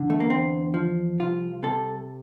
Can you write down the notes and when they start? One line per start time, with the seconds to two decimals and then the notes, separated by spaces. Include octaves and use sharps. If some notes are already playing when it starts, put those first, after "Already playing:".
Already playing: E2 D3
0.10 A3
0.20 A#3
0.30 E2 C4
0.74 F3
1.20 C2 F4
1.63 C3 A4